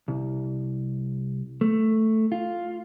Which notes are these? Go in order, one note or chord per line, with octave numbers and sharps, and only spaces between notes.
C2
A3
F4